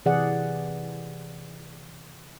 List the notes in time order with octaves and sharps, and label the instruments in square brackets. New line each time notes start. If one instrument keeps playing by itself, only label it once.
[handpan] C3 E3 G#4 D5 F#5